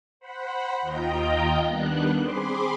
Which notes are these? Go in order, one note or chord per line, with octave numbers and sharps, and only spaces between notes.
C5 F#5 B5
D#2 F4 D#5 G5 A#5 G6
D#3 G3 B3 D4 F#6
C4 G#4 B5 C6 D6